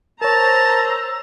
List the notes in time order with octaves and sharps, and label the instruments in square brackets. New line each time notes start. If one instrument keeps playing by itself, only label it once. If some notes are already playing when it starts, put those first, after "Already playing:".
[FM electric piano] A#4 C#5 [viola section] C5 A#5 [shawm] A5 [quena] E6